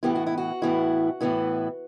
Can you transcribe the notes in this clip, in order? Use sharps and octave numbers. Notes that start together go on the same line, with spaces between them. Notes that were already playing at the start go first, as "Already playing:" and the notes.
A2 E3 B3 E4 G4
F#4
E4
F#4
A2 E3 B3 E4
A2 E3 B3 E4